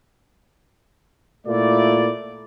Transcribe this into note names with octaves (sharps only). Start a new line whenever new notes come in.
A#2 A3 A#3 E4 F4 D5